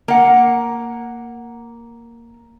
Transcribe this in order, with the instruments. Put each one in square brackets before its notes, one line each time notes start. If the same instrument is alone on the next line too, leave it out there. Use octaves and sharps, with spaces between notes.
[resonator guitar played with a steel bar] A#3 F#5